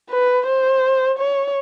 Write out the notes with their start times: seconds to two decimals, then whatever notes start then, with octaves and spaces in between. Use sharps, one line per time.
0.09 B4
0.46 C5
1.19 C#5